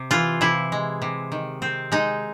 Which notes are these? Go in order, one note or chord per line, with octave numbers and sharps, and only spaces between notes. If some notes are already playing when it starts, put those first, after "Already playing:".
Already playing: C3
E3 F4
C3 E4
G#3
C3
D#3
C4
G#3 D#4